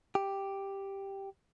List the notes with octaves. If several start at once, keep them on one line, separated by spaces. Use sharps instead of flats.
G4